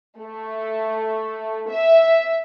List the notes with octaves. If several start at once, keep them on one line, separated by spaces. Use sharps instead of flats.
A3
E5